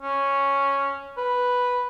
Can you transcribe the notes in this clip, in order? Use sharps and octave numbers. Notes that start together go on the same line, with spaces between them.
C#4
B4